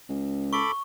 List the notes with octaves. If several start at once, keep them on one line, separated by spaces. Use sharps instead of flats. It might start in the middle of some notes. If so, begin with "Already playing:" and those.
C#2
A4 B5 C#6 D6